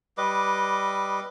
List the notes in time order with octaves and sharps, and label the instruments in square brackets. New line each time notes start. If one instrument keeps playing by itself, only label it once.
[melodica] G3 B4 D#5 D6